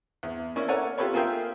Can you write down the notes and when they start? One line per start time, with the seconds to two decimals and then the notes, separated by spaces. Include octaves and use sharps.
0.23 E2
0.56 A#3 C#4 D4 E4
0.68 A4 A#4 C#5 D5 F#5 G#5
0.98 F4 G4 A4 B4 C#5
1.14 A#3 F4 G#4 A#4 E5 G5